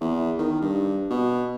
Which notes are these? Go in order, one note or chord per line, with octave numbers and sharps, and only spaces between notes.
E2
D#3
G2
B2